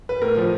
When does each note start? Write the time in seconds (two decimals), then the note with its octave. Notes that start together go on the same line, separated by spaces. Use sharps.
0.09 B4
0.21 A2 A#4
0.37 F3